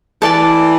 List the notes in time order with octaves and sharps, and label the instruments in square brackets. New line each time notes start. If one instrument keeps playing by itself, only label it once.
[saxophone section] E3 [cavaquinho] A4 D5 A5